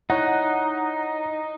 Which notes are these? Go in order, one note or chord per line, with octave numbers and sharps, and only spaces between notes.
D#4 E4 C#5 F#5